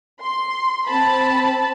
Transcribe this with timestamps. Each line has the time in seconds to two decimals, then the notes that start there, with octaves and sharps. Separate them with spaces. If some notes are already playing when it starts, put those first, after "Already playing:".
0.22 C6
0.87 C4 A5 B5